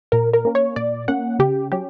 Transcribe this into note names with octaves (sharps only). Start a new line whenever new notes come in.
A#2 A#4
A#4
A#3 C#4
C#5
A#2 D5
A#3 C#4 F#5
C#3 G4
F#3 C#4 G4